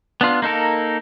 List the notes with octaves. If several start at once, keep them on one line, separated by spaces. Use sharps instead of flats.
B3 D4 F4
A#3 D#4 A4 A#4